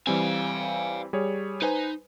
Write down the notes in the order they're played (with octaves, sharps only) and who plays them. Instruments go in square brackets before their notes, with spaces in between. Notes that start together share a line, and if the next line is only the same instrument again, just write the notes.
[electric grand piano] E3 G3 C4 [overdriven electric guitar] F5 G#5
[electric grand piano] G3 G#4 C#5
[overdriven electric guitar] D#4 [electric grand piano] B4 C5 G#5